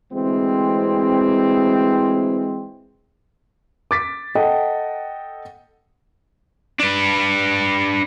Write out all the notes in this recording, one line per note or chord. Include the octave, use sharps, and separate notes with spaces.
D2 E3 G#3 C4
D6 A6 B6
A4 D#5 F#5 G5
D4 B4